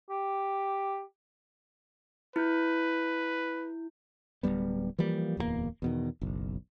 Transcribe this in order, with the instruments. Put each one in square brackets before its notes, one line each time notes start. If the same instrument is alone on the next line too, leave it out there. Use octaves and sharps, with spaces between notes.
[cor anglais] G4
[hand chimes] E4 G6 [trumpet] B4
[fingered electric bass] D1 G#2 G3 B3
E3 F3 G3 A#3
D1 E2 F#3 A#3
E2 B2 D#3
F#1 B1